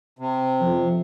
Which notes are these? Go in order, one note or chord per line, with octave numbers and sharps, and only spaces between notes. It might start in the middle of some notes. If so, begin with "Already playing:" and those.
C3
F2